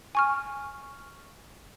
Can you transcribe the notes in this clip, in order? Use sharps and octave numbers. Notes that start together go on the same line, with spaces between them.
G#5 C#6 F6